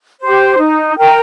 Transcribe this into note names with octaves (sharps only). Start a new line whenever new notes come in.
G4 C5
D#4
A#4 G5